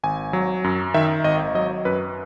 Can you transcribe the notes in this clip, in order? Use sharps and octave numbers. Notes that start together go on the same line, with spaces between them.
G#1 G#5
F#3
F#2
D#3 E5
G#1 D#5
F#3 D#5
F#2 B4